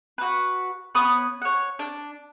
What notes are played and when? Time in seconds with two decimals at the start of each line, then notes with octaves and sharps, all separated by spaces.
0.18 F#4 B4
0.95 B3 C#5 B5 D#6
1.42 C#5 F#5
1.79 D4